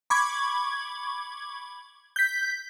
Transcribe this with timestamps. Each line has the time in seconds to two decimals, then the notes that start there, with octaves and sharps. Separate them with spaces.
0.10 B5 C#6 D6 G#6
2.16 G6 B6